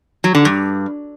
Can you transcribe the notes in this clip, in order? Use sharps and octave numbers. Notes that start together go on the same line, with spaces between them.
F#3
D3
G2